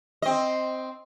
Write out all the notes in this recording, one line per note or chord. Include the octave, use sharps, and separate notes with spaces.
C4 D#5